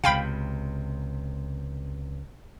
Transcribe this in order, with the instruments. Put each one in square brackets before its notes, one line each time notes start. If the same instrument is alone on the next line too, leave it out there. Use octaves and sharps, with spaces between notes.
[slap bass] C#2 C3 [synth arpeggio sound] F5 G5 B5